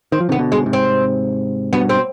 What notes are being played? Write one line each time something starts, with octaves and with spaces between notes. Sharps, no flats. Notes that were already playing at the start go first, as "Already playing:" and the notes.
D#3 C4
F3
C3 D#3 B3
B2 D3
G#3
G#2 C3
C4
G2 B2 B3
C4